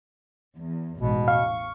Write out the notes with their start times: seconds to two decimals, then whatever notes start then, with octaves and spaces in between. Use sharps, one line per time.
0.56 E2
0.98 A1 E2 G#2 B2
1.28 F5 C#6